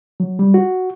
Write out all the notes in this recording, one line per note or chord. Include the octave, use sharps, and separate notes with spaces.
F#3
G3
F#4